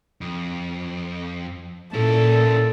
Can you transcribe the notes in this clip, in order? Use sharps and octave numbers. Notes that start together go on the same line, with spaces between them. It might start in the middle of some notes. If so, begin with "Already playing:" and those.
F2
A#2 C#4 E4 A4